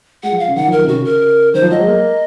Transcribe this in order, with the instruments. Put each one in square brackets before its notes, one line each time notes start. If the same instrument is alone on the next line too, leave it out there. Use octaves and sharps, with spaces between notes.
[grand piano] G#3 [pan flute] F#5
[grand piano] F3
[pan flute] F5
[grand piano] C#3
[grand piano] D#3 [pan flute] F#5
[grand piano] F3
[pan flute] A#4
[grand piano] D#3
C3
[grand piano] C#3 [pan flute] F#4
[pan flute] A#4
[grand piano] D#3 [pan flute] C5
[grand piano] F3
[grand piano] F#3 [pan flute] D#5
[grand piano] G#3
A#3